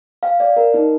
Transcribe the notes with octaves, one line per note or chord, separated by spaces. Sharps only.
F5
D5
A#4
D#4